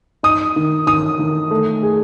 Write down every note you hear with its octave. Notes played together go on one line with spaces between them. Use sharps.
D#4 D#6
D#3
D#3 D#6
D#3
A3
G#4